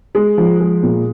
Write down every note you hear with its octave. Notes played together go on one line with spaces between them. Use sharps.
G#3
F3
G#3
A#2